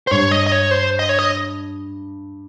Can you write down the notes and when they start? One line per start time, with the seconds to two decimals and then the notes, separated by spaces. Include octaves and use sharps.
0.07 C5
0.11 G2 C#5
0.32 D#5
0.47 D#5
0.52 C#5
0.71 C5
0.99 D#5
1.09 C#5
1.19 D#5